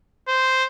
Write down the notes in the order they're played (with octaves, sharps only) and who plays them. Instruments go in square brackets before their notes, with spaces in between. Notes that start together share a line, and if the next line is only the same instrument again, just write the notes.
[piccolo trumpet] C5